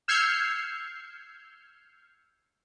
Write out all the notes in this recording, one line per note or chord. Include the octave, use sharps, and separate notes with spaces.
E6 F6 G6 G#6 C7 C#7